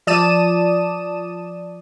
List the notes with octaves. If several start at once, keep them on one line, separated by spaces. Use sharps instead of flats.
F3 D5 A5 D#6 D#7 E7